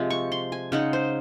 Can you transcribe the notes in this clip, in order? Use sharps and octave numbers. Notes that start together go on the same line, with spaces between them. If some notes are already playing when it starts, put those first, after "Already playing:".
Already playing: C3 F3 G#3
C#6
C6
G#5
C#3 G#3 D#4 F#5
C5